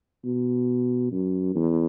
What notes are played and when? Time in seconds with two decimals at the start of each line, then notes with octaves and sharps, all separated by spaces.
0.25 B2
1.12 F#2
1.55 E2